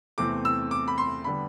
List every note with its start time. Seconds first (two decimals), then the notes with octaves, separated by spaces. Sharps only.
0.18 E2 C3 E3 A3 C4 D6
0.45 E6
0.71 D6
0.88 B5
0.98 C6
1.24 D3 G3 B3 B5